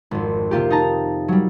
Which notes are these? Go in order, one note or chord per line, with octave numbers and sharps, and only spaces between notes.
G#1 F2
C3 A#3 F4 G4
D#4 D#5 A5 A#5
F#3 G3